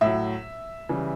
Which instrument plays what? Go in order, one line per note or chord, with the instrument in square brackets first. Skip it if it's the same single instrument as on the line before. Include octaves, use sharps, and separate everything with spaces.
[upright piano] A2 E5
F#3
C#3 E3 G3